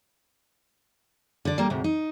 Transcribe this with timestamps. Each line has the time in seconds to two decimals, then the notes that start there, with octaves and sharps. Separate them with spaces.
1.45 D3 D5
1.58 G3 A#3
1.70 D2 G#2 C3
1.84 D#4